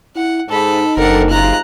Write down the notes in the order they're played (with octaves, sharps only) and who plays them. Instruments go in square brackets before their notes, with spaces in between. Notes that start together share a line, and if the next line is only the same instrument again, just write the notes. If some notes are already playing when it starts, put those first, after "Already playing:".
[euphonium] E4 [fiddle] F#5
[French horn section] G#2 [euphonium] D#4 [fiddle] A4 B5
[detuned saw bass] F#1 [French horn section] C4 D4 A4 [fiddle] A#4 F#5
[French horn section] C3 G#3 F4 [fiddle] A#5 F#6